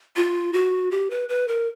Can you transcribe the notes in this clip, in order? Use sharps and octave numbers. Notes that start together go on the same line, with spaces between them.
F4
F#4
G4
B4
B4
A#4